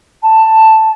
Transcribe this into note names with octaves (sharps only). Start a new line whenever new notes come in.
A5